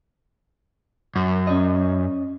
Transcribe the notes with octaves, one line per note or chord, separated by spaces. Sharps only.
F#2
C#4 D5 D#5